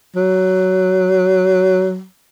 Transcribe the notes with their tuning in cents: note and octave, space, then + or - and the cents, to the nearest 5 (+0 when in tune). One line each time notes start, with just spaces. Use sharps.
F#3 +15